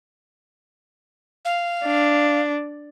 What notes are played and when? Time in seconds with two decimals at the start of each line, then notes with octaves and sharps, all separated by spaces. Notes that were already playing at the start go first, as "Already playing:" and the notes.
1.45 F5
1.85 D4